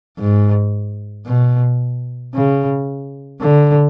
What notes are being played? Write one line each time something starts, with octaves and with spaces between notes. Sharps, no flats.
G#2
B2
C#3
D3